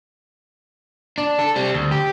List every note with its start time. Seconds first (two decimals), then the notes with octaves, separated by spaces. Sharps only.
1.18 D4
1.39 A4
1.56 G3 C4
1.74 D2
1.91 G4